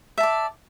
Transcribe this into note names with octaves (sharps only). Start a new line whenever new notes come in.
D5 E5 A5